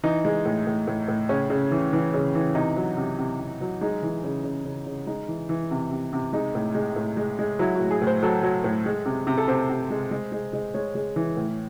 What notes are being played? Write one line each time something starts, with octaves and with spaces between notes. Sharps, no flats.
E3 D#4
G#3
A2
A2
A2
A2
C#3 C#4
C#3
E3
E3
C#3
E3
C3 D#4
F#3
C3
C3
C3
F#3
G#3 D#4
E3
C#3
C#3
C#3
C#3
G#3 D#4
E3
E3
C3
C3
C3
G#3 D#4
A2
G#3
A2
G#3
G#3
F#3 E4
A2 F#4
G#4
A2
C5
F#3 A4
F#3
A2
G#3
C3
C3
A4
C3 C5
C3
G#3
G#3
G#3
G#3
G#3 C#5
G#3
E3
A2